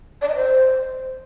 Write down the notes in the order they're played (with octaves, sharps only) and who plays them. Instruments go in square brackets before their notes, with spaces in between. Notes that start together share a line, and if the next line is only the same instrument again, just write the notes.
[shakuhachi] D5
D#5
C5